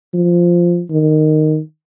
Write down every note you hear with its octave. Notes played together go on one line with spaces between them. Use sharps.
F3
D#3